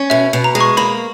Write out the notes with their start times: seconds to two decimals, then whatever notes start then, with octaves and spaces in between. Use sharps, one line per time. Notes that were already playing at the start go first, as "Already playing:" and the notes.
Already playing: C#4
0.10 B2 E5
0.33 B2
0.44 A#5
0.55 G#3
0.60 C#6
0.77 A#3 B5